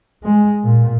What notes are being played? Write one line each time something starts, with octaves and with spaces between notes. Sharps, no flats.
G#3
A#2